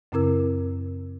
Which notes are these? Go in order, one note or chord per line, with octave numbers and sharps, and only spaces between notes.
F#2 C#3 C4 E4 A#4 E6